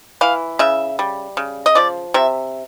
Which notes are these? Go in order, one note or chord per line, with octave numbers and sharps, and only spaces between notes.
E3 F5
C#3 E5
G3
C#3
D#5
F3 D5
C3 E5